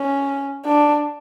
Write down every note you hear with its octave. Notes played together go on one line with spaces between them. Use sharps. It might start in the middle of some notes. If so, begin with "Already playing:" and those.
Already playing: C#4
D4